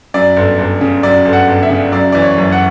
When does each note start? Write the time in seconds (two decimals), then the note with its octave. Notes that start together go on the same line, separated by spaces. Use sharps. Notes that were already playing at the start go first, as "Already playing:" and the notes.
0.14 F#2 D5
0.36 G1
0.59 G1
0.81 C#3
1.03 F#2 D5
1.25 G1
1.33 F#5
1.48 G1
1.63 E5
1.70 C#3
1.92 F#2 D5
2.12 E3 D5
2.22 C#5
2.37 F#1
2.52 F#5